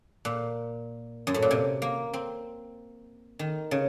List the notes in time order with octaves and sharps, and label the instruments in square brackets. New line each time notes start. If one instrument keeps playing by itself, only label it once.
[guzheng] A#2
F#2
A2
A#2
C3
A#3
C4
D#3
C#3